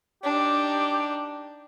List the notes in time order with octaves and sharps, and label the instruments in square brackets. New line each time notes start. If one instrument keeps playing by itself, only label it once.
[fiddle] D4 D#4 [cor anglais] G4